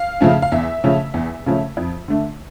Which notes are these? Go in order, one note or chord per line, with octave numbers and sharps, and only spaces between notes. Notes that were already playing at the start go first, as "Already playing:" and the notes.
Already playing: F5
C#3 F3 A3 C#4
F5
E2 E5
C#3 F3 A3 C#4
E2
C#3 F3 A3 C#4
F2
D3 A3 D4